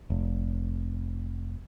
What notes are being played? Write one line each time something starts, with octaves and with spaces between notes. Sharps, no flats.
F1